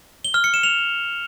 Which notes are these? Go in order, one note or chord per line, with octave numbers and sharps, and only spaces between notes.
G7
F6
C#7
E7
F7